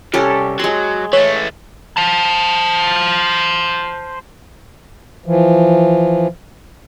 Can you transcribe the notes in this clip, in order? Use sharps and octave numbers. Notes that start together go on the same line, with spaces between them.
C2 C#4 G4 A4
F#3 G#3 C6
E3 A3 C#5
C5 A5
E3 F3